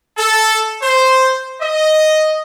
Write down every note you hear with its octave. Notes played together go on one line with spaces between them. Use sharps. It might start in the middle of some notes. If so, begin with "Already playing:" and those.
A4
C5
D#5